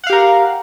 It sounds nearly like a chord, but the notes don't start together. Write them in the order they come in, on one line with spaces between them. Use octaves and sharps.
F#5 F5 G4 A#4